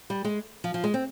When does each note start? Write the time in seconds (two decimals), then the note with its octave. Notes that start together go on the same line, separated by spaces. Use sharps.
0.10 G3
0.25 G#3
0.64 F3
0.74 F3
0.84 G#3
0.94 C4